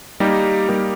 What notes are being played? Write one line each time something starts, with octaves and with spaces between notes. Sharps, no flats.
G3 A#3 D#4 G4 A#4
G3 A#3 D#4 G4 A#4